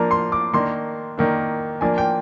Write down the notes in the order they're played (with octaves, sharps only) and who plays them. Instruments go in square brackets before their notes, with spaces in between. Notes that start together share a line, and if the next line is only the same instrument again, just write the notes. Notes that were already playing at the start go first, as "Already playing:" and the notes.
Already playing: [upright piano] F3 A#3 D4 A#5
C6
D6
D#3 A#3 D4 C6
D#3 A#3 D4
F3 A#3 D4 G#5
G5